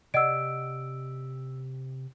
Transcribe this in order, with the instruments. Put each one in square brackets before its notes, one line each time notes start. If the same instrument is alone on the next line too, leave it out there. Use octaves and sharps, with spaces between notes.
[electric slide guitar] C3 G4 [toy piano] D5 D#5 F#5 [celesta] E6 D7